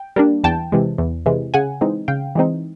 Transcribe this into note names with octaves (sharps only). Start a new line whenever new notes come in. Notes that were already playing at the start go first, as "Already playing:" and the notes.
Already playing: G5
G3 A#3 D4
E2 G5 A5
C3 E3 G#3
E2
C3 E3 G#3
C#3 F#5 G#5
E3 G#3 C4 D#4
C#3 F5 G5
E3 G#3 C4 D#4